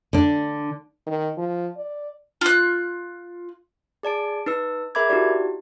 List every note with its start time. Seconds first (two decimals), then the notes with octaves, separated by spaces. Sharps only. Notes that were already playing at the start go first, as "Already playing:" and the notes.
0.13 D3 D4
1.07 D#3
1.38 F3
1.77 D5
2.41 F4 F#6
4.03 G#4 D5 A5 D7
4.46 D#4 B4 E6
4.95 G#4 A#4 E5 B5 D6 G#6
5.09 D#4 E4 F#4 G4 D5